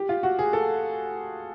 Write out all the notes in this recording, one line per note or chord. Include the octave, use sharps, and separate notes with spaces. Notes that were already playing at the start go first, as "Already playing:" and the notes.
Already playing: G4
F4
F#4
G#4
A4